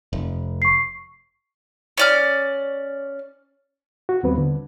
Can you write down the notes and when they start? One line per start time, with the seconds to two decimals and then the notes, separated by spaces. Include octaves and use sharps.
0.13 F1
0.62 C#6 C7
1.98 C#4 D5 F6
4.09 F#4
4.23 D#2 G3 B3 C4 B4
4.38 D3